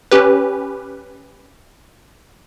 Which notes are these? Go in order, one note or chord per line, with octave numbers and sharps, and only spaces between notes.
C#4 G4 B4